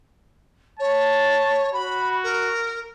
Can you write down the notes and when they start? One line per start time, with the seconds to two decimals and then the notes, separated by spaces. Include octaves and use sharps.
0.79 C#5 A5
1.73 F#4 B5
2.23 A#4